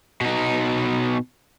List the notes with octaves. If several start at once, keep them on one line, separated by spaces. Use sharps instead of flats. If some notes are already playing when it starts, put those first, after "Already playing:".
B2 D#4